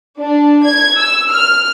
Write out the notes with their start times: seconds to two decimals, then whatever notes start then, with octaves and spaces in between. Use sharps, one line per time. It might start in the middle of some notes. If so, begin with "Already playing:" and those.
0.19 D4
0.65 G#6
0.98 E6
1.31 F6